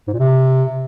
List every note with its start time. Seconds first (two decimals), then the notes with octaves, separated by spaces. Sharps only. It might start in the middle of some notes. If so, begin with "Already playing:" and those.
0.07 G#2
0.13 A#2
0.19 C3